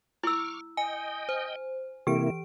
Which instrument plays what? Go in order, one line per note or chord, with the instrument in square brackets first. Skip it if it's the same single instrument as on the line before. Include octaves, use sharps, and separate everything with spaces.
[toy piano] E4 E6 [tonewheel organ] C#6 D6 F6
[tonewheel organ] D#5 G5 [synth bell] G#5
[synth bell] C5
[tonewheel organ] C3 A#3 E4 [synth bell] E3 D7 [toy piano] G4